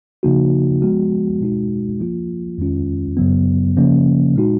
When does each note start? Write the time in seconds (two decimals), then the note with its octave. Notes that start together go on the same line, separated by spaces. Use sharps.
0.23 C#3 F3 A#3 D#4 F#4
0.82 F3 G#3 B3 F#4
1.40 B2 G#3 D#4 F#4
2.00 F3 A#3 F4
2.58 F2 D#3 G#3 C#4 F4
3.17 F#2 C#3 F#3 B3
3.77 C#3 F3 A#3 C#4
4.35 A#2 G#3 D#4 F#4